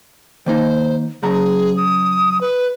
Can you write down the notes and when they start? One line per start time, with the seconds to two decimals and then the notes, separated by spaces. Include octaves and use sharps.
0.46 D#3 A#3 D#4 C5
1.23 C#3 F#3 G#4 A#5
1.77 D#6
2.41 B4